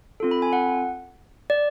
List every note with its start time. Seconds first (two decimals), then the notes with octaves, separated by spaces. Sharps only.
0.20 C4 F4 A4
0.31 B5
0.42 G#5
0.53 F#5
1.50 D5